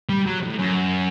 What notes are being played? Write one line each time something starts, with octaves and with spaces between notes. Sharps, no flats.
G3
F#3
A2
F#2